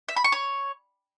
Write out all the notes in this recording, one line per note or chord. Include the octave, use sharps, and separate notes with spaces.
E5
B5
C#6
C#5